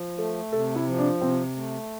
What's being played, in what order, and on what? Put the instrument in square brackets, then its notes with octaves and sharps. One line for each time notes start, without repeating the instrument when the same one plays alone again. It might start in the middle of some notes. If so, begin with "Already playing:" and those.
Already playing: [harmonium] F3
[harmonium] A3 [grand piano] A4
[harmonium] C3 [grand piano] A4
[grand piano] E4
[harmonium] F3
[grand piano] D4
[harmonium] C3 [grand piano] C4
[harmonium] A3